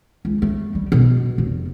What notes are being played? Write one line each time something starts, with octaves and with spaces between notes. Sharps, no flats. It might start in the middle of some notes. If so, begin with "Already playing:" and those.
C#2
A3
G3
B2
F1